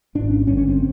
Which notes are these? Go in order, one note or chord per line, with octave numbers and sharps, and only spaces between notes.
G#1 G#2 D4
C#4
G#1 G2 D3 C#4
C#4
C4